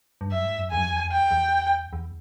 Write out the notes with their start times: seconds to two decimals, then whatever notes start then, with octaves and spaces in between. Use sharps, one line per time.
0.21 G2
0.31 F#2 E5
0.45 G#2
0.58 F#2
0.71 E2 G#5
0.77 F#2
0.82 F2
0.92 E2
1.02 F2
1.12 E2 G5
1.31 E2
1.93 E2